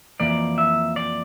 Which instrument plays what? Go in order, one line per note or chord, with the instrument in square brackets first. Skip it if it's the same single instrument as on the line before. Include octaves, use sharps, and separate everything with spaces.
[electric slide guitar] F2 E3 A#3 D5
E5
D5